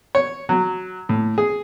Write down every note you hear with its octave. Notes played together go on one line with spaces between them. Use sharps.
C#5
F#3
A2
G#4